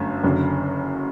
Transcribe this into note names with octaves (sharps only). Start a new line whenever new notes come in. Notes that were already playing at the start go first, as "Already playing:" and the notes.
Already playing: G1 F#2 A3
F#1 F#2 D3